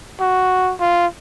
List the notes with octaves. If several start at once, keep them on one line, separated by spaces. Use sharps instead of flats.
F#4
F4